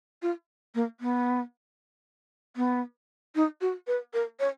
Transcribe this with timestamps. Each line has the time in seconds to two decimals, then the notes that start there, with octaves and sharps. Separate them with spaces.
0.22 F4
0.75 A#3
1.00 B3
2.56 B3
3.35 D#4
3.61 F#4
3.87 B4
4.14 A#4
4.40 C#5